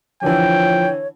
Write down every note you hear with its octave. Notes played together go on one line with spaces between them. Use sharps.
D3 E3 F3 C#5 G5